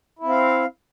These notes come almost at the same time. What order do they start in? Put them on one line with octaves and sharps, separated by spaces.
E4 C4 F5